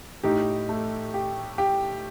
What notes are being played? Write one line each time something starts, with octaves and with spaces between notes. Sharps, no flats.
A2 D#4 G4
A3
G4
G4